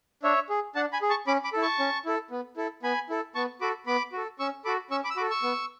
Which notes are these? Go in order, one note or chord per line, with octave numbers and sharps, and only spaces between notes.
D4 C#5 E5
G#4
D4 F#5 A5
G#5 B5
G#4
A5 C#6
C#4 B5 D6
B5 D6
E4 A4
A5 C#6
C#4
E4 A4
B3
E4 A4
B3 G#5 B5
E4 A4
B3 A5 C#6
F#4 A4 B5 D6
B3 B5 D6
F#4 A4
C#4 C#6 E6
F#4 A4 B5 D6
C#4 C#6 E6
B5 D6
E6
F#4 A4 B5 D6
C#6 E6
B3